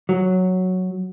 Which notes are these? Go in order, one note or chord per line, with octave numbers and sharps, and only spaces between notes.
F#3